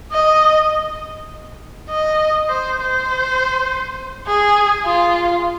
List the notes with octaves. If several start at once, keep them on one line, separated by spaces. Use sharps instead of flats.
D#5
D#5
C5
C5
G#4
F4